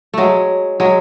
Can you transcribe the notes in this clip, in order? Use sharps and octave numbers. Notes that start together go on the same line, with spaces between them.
F#3 G#3 A3
F#3 G#3